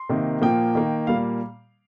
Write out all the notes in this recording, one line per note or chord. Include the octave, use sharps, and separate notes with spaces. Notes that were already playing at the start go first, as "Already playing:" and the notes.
Already playing: C6
C3 D#3 A#3
A#2 F3 A#3 G5
D#3 A#3
A#2 G3 A#3 F5